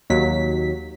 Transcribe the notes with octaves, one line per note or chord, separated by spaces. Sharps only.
D#2 F#3 B6